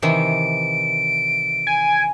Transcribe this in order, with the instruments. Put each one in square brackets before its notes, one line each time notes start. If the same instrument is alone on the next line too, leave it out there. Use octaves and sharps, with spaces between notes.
[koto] C3 D#3 E3 [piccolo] D7
[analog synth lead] G#5